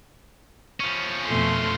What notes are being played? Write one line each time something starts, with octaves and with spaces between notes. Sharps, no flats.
F3 C#4
F2 B2 A3 C6